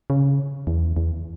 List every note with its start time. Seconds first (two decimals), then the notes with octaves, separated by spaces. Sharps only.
0.10 C#3
0.67 E2
0.96 E2